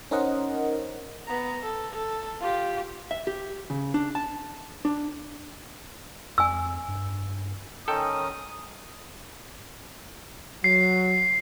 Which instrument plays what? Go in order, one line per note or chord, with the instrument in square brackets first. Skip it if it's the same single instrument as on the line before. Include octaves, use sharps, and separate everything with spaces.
[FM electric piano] C#4 D#4 A#4 C5 D#5 F#5
[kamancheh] B3 A#5
A4
A4
F4 G4
[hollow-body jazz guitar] E5
G4
C#3
D4
A5
D4
[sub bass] F2 [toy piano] G#5 E6
[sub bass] G2
[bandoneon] D#3 C#4 D#4 [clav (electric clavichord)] A4 G5 [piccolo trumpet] D#6
[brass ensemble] F#3 [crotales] C7